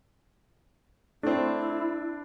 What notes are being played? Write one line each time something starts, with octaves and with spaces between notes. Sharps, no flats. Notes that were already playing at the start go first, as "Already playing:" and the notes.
A3 C4 D4 E4